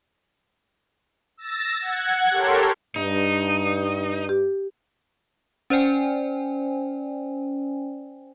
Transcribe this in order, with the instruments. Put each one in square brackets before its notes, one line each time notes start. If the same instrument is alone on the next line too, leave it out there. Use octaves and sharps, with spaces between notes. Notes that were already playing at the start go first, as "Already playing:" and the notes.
[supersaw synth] E6 A6 A#6
F#5 G#6
G4 A4 A#4 C#5 C6
[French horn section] G2 [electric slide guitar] D#4
[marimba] G4
[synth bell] C#4 C5 D5 G5 G#5